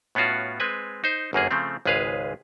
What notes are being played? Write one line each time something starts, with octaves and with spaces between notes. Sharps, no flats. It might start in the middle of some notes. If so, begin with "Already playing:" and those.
A2 B3 C#4 F4 F#4
G#3 C4 B4 G#5
D#4 C5
G1 F#2 A#3 G#4
C#3 F3 A3 C4
G#1 C#2 G#3 G#4 B4 F5